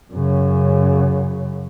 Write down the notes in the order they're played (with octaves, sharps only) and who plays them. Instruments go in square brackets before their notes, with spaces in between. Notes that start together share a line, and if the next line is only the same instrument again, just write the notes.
[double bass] F#2 C#3